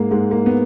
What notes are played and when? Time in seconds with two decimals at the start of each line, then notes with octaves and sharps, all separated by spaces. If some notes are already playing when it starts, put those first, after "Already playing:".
Already playing: G#2 G#3 A#3
0.11 G#2 G#3
0.31 A#3
0.46 B3